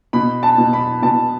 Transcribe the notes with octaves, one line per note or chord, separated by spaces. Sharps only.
B2 B5
A5
B2
B5
B2 A5